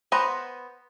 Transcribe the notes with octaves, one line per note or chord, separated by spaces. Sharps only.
B3 B4 C5 A#5